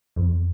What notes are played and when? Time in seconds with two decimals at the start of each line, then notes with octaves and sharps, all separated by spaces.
0.16 F2